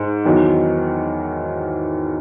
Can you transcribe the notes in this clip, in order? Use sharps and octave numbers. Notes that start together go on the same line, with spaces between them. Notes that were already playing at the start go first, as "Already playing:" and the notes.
Already playing: G#2
E2 D#3 F#3